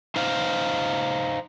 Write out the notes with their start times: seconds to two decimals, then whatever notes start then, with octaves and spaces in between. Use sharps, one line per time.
0.16 D#4 C5 D#5 F5